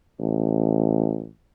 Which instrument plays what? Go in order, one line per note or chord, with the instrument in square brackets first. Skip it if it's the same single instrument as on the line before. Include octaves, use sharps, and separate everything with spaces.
[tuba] A1